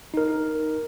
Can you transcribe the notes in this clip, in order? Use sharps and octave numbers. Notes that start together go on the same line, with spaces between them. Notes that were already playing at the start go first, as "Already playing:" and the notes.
D#4 A#4